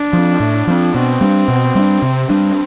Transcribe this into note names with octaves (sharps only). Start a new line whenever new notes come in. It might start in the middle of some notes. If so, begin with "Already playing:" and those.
Already playing: D4
F3 C4
A2
F3 C4
B2 C4
G3 B3 D4
B2
G3 B3 D4
C3
G3 D4